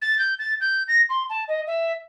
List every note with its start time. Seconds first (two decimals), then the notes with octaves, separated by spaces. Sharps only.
0.02 A6
0.19 G6
0.39 A6
0.61 G6
0.88 A#6
1.10 C6
1.30 A5
1.48 D#5
1.67 E5